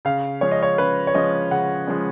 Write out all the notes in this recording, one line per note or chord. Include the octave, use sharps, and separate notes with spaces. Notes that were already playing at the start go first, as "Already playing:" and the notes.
C#3 F5
F3 G#3 C#4 C#5
D#5
C#5
C#3 B4
C#5
F3 G#3 C#4 D#5
C#3 F#5
F3 G#3 C#4